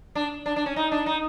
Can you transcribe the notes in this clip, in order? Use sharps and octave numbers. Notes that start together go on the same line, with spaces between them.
D4
D4
D4
C#4
D#4
D4
D#4